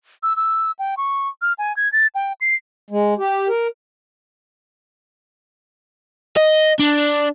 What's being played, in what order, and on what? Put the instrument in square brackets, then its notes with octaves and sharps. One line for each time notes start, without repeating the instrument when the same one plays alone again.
[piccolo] E6
E6
G5
C#6
F6
G#5
G#6
A6
G5
C7
[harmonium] G#3
G4
A#4
[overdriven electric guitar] D#5
D4